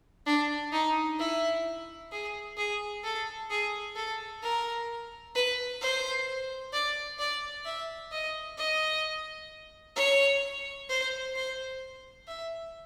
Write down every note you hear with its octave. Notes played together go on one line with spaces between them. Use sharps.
D4
D#4
E4
G#4
G#4
A4
G#4
A4
A#4
B4
C5
D5
D5
E5
D#5
D#5
C#5
C5
C5
E5